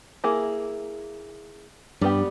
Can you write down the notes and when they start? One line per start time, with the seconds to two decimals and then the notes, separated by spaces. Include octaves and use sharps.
0.24 A#3 E4 G#4
2.01 G2 G3 B3 G4